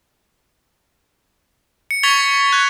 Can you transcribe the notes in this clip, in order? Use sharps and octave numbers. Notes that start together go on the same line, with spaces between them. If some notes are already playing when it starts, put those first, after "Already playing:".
C#7
C#6 G#6 A6 B6 F7 G7
F#6 G#6